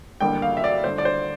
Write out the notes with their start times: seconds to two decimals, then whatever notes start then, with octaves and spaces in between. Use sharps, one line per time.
0.21 A1 G2 D3 G3 A#3 G5
0.42 F5
0.57 E5
0.64 D5
0.84 G1 G2 D3 C5
0.98 D5
1.05 C5